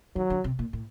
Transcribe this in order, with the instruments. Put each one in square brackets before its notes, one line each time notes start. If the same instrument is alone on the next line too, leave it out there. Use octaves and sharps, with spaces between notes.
[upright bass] D#3 [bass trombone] F#3
[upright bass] D3
C3
A#2
A2